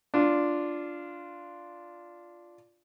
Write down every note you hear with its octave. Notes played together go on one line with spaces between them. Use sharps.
D4 F4